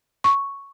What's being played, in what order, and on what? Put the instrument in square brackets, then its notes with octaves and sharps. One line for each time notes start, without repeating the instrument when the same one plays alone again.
[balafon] C#6